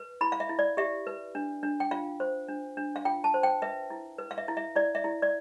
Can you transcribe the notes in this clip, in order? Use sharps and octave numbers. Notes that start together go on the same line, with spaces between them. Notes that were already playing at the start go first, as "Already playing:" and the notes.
Already playing: B4
E4 B5
F5
E5
E4
D5
G4 E5
B4
D4
D4
G5
F4 F5
C5
D4
D4
F5
F4 G5
A5
C5
G5
B4 E5
E4
B4
F5
E5
E4
E5
E4 D5
E5
E4
D5